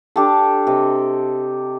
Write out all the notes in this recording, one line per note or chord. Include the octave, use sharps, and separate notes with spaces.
D4 G4 A4
C3 D#5